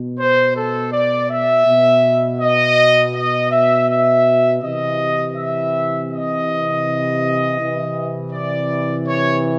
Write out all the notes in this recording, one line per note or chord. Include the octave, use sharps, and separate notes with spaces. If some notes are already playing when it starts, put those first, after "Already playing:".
Already playing: B2
C5
A4
D5
E5
B2
D#5
D#5
E5
E5
C3 E3 D#5
E5
D#5
C3 E3
D5
C#5